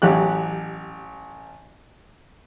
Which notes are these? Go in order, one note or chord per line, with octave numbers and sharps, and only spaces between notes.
A1 F#3 G4 F#6